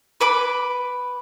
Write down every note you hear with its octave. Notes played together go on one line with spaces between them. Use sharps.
B4 B5 D6